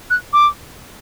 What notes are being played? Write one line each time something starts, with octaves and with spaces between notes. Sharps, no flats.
F#6
D6